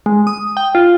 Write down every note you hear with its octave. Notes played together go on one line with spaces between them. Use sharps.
G#3
D#6
G5
F4